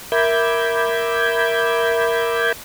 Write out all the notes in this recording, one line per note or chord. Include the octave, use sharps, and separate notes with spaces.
A#4 E5 B5 D6 G6 G#6